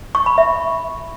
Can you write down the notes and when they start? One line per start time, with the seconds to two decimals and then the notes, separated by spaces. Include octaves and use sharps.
0.15 C#6
0.26 B5
0.38 E5